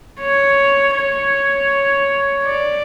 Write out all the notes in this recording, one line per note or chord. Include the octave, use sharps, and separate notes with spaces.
C#5
C#5
D5